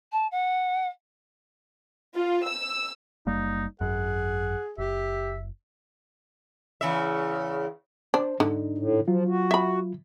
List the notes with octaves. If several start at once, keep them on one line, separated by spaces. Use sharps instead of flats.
A5
F#5
F4
E6
F#1 G3 A#3 D#4
G#1 F#2 G#4 F#5
F#1 G4 E5
E2 C#3 E5
D4 C5
G#2 D3 D4 D#4
A2
F3 F#3 F4
F#4
E5 B5